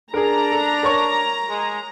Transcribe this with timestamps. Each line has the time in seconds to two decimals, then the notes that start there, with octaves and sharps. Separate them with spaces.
0.14 D4 G#4 A#4 A#5
0.52 A4
0.83 A#4 C#5 C#6
1.49 G#3